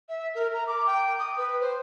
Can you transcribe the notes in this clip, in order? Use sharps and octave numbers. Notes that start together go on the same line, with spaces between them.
E5
A#4
A#5
D6
G5
D#6
B4
C5